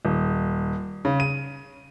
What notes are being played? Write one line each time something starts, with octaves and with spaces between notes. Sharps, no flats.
D#1
C#3
D#7